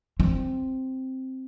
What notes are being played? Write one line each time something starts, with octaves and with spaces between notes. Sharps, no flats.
C4